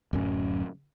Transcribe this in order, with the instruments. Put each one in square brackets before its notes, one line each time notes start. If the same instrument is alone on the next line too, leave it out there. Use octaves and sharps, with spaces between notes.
[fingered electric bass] D1 F#2 C#4